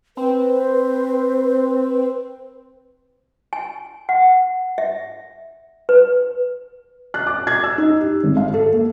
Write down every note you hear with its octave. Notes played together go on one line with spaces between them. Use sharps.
C4 B4
G#5
F#5
E5
B4
F#6
D6
G#6
E6
D#4
G4
G#1
F5
A4
A#3